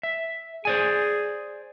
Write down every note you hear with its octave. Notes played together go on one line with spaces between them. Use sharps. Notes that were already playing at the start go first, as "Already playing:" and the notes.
E5
G#4 C5 D5 G#5